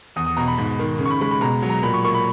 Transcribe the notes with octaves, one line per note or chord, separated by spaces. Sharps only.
E2 D#6
D#6
B2 A#5
B5
G#2 B5
D#3
C#3
C#6
B5
G#3 B5
B5
B2 A#5
F#3
A#5
A#2 B5
C#6
A#3 C#6
B5